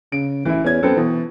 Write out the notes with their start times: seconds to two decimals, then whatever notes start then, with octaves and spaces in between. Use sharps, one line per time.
0.12 C#3 D7
0.45 A1 E3 E4
0.64 E2 C#4 G#6
0.83 F#2 B3 C4 A4
0.97 B2 E3